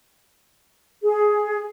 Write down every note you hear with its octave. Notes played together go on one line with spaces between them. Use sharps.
G#4